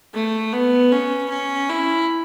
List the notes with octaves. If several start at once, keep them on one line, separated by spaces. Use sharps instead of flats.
A3
B3
C#4
C#4
E4